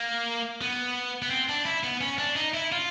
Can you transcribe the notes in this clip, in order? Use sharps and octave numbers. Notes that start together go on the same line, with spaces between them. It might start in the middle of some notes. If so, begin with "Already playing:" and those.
Already playing: A#3
B3
B3
C4
D4
E4
B3
C#4
D4
D#4
E4
F4